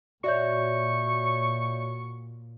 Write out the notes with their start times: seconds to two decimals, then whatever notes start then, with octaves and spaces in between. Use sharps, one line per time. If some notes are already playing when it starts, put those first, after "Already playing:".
0.24 A#2 F#4 C#5 D5 E5 C#6 G6